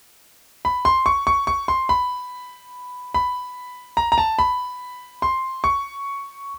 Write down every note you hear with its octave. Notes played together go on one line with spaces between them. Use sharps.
B5
C6
C#6
C#6
C#6
C6
B5
B5
A#5
A#5
A5
B5
C6
C#6